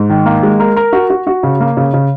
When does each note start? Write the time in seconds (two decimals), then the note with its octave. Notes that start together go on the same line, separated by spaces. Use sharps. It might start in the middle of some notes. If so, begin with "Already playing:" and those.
Already playing: G#2
0.10 D#3
0.26 A#3
0.43 G#3
0.60 A#4
0.76 A#4
0.93 F#4
1.10 F#4
1.27 F#4
1.43 C#3
1.60 A#3
1.77 C#3
1.94 C#3